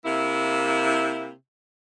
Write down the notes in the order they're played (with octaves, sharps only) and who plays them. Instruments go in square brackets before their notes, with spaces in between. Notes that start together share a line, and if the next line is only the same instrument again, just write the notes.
[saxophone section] C3 A#3 E4